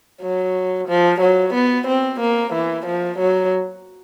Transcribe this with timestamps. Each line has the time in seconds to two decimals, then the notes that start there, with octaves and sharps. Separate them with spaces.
0.21 F#3
0.88 F3
1.21 F#3
1.54 B3
1.87 C4
2.20 A#3
2.53 E3
2.86 F3
3.19 F#3